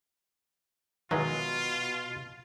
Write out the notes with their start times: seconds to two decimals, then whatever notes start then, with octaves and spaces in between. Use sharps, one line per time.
1.11 B2 D#3 E3 F#3 G#3 F4 F#4